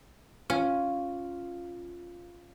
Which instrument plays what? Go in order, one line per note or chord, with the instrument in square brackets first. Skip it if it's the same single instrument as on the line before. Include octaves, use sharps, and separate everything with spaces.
[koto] C#4 [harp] F4